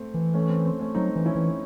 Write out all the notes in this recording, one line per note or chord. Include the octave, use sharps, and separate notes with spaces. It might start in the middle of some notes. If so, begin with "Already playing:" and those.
Already playing: A3 C4
E3
A3 C#4
C4
C4
A3 C#4
F#3 C4 D#4
E3
C#4 E4
E3